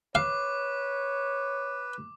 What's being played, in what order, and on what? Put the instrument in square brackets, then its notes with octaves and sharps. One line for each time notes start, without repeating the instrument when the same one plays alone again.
[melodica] B4 [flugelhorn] C#5 [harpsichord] F5 [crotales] D6